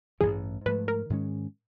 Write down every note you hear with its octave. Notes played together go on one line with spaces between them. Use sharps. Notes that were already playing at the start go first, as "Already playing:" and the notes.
A1 G2 E3 A3 G#4
G#2 F3 A3 B4
A#4
G#2 D#3 G#3 C#4